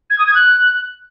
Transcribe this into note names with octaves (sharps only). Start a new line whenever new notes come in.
G#6
D#6
G#6
F#6